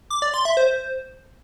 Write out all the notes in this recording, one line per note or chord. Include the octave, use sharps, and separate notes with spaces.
D6
D5
C6
E5
C5